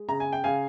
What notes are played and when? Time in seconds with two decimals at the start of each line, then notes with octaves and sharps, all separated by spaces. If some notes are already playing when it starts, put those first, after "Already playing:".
Already playing: G#3
0.08 C#3 A#5
0.20 G#5
0.32 G5
0.44 C#3 F5 G#5